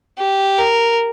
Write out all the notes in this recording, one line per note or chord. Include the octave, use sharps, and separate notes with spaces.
G4
A#4